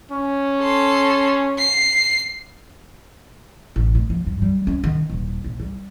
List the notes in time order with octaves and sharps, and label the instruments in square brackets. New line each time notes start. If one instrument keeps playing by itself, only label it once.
[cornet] C#4
[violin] A4 C6
C7
[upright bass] A1
A2
F3
G2
G3
C#4
D#3
D#1
A#1
G3